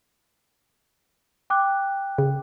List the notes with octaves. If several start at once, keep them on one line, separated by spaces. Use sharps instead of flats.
G5 D6 F#6
C#3